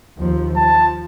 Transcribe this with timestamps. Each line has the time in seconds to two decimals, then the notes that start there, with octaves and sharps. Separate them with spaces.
0.18 D#2 F3
0.56 F3 A5